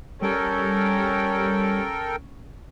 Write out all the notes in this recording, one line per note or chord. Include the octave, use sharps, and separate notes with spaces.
G3 C#4 A4 A#4 G5